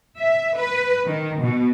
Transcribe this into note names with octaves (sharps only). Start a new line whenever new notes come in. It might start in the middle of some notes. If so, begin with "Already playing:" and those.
E5
B4
D#3
B2